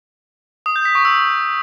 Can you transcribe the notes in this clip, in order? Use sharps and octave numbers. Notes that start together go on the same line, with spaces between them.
D#6
G6
B6
C#6
E6